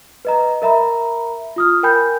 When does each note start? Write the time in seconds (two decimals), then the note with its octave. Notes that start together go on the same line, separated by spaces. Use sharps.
0.25 B4 D#5 A#5
0.62 A#4 E5 A#5 B5
1.56 F4 D#6 F6
1.83 A#4 G5 G#5 B5 G6